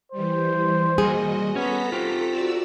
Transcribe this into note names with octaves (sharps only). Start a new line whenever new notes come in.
E3 G3 C5
G3 A#3 F#4 G#4 D#5
B3 C#4 A4 C#5 A#5 B6
C4 F4 G4
F#4 D5 E6